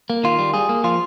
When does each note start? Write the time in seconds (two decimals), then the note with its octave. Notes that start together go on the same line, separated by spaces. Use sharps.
0.10 A#3
0.24 D#3 F4
0.39 G3
0.54 G3 G#4
0.69 A#3
0.84 F3 F4